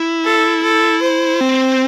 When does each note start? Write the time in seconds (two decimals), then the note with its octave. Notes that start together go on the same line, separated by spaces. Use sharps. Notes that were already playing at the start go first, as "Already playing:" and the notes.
Already playing: E4
0.24 A4
0.63 A4
1.02 C5
1.41 C4